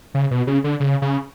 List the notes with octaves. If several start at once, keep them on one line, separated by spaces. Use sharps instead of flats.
C#3
B2
C#3
D3
C#3
C#3